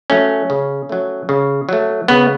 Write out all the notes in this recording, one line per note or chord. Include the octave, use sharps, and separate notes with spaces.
F#3 A3 C#4
C#3
F#3 A3
C#3
F#3 A3
C#3 B3